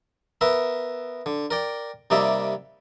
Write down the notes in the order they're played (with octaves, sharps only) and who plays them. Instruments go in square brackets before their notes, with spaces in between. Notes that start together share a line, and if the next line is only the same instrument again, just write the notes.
[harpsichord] B3 A#4 E5
D3
A#4 D5 G5
C3 G3 A#3 D#4 D5 E5